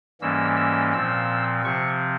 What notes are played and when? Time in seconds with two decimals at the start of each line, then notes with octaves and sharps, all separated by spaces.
0.21 G#2 E3 G3 A#3 C#4 E6
0.57 E6
0.92 A#2 F3 C4 E6
1.64 C3 F3 C4 C#6